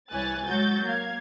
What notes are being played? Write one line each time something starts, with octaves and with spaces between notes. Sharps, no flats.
C2 E3 C#5 G#5 F#6 A6
F#3 G#3 F#4 G6 A6
A#3 F5 G#6